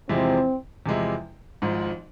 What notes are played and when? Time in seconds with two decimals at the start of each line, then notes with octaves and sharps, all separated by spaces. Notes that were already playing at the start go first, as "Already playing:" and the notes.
0.09 E2 C3 F3 G#3 C4 E4
0.86 E2 C3 F3 G#3 E4
1.62 G#1 G#2 F3